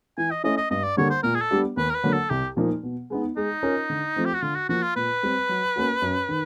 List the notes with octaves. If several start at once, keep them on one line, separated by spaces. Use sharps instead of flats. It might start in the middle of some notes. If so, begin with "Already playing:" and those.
E3 G#5
D#5
A3 C#4 E4 D#5
D#5
G2 D#5
D5
D3 G3 A#3 C#5
C5
A#2 A#4
G#4
A4
G3 B3 D4 G4
D#2 B4
A#4
B4
D3 F#3 A#3
A4
C2 G4
A#2 F3 A#3 D#4
B2
G#3 B3 D#4
G#3 D#4
C#4 F4 A#4 C#5
D3
F3 A3 C4
G4
F#4
D3 F4
F#4
F3 A#3 F#4
F4
A#2 B4
G3 C4
F#3
A#3 C#4 F#4
F#2
D#3